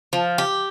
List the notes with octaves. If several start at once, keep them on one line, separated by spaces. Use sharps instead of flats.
F3
G4